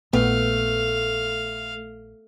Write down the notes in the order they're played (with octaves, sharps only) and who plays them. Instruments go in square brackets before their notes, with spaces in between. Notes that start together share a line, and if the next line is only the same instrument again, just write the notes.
[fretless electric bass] A#1 [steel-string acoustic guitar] A3 [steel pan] B3 [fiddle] F5